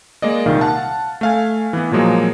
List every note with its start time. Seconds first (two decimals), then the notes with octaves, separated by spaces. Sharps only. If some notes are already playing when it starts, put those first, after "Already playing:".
0.22 G#3 A#3 D5 D#5
0.46 C2 A#2 D#3 F5
0.61 F5 F#5 A5
1.21 A3 F5 G#5
1.73 E3 B3
1.91 A#2 F3 F#3 G#3 A#3